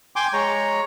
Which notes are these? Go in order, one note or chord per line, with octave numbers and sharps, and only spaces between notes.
G5 G#5 C6 D6
G#3 C#5 A#5